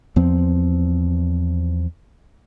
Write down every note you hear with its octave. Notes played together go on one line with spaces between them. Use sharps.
E2 F3 C4